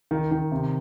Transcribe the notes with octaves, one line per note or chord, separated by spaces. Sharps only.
D#3
D#3
C3